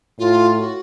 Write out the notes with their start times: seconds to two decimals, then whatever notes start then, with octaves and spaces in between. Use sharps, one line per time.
0.19 A2 F4
0.57 F#4